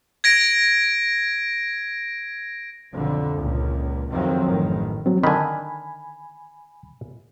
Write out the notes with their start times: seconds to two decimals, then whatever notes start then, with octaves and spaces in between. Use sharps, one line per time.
0.24 G#6 A#6 D7
2.94 B1 F2 D3
3.39 C#2 A#2
4.11 F2 C3 D#3 F3 F#3 C4
4.45 A1 F#2 D#3
5.06 F#3 C4
5.23 D3 D#3 G#5 B5